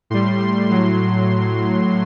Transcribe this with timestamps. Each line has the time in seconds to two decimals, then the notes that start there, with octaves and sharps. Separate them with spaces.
0.10 A2 G3 C6
0.39 C6
0.69 A2 F#3 C6